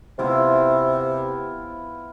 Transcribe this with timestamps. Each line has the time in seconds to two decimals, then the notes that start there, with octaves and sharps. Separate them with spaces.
0.19 C3 B3 E4 F4